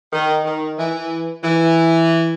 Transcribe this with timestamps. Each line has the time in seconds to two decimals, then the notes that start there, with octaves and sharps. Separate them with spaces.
0.12 D#3
0.45 D#3
0.78 E3
1.43 E3